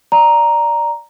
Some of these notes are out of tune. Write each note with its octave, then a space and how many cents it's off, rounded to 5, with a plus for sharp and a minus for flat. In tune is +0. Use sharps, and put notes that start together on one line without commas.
D5 +0 A#5 +0